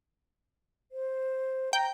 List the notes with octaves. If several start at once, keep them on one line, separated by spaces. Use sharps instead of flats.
C5
G5 A#5